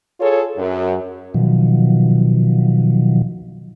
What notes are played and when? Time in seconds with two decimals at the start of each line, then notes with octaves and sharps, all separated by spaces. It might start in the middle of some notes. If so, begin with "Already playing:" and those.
0.20 F4 G#4 A4 C#5
0.56 F#2
1.34 B2 D#3 F3 F#3